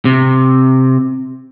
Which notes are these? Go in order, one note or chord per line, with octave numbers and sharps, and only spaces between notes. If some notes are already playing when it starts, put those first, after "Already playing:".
C3